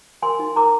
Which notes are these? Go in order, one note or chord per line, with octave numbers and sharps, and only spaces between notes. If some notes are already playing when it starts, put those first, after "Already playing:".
A#4 G#5 C6
D#4
A#4 A#5 D6